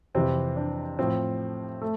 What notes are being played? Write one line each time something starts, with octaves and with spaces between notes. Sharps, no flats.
F2 C3 E3 C4
D4
A2 F3 C4
A3